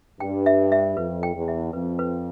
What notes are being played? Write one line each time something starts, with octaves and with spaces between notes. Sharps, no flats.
G2 G5
E5
E5
F2 B4
G5
E2
E5
F2 B4
B4